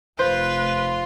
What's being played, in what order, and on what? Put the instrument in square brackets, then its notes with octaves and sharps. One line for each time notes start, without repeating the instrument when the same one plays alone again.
[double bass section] F1 [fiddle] F4 [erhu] B4 [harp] C5